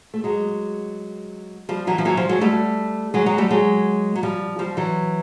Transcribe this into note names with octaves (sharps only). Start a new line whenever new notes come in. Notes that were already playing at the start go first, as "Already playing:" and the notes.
A3
F#3 G#3
F3 G3
E3 F#3
F3
E3 F#3
F3 G3
F#3 G#3
G3 A3
F#3 G#3
F#3 G#3
G3 A3
F#3 G#3
F#3
F3 G3
F3 G3
E3 F#3